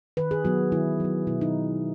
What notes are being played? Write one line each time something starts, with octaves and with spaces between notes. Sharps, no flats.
D#3 B4
G#4
F#3 B3 F#4
D#3 E4
F#3 B3
B2 E4
D#4